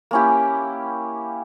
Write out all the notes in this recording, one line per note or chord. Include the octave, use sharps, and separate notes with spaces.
A#3 C#4 E4 G4